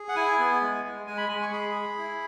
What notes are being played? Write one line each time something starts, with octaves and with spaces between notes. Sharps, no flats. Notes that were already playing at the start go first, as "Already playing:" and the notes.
Already playing: G#4
F#5
E4 G#5
B3
G#3
G#3
G#3 G#5
B5
G#3 G#5
C#6
G#4 B5
G#4
E4